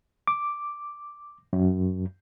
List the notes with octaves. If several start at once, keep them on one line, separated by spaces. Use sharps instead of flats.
D6
F#2